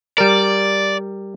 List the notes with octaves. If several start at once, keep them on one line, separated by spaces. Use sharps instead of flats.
G3 A#4 D5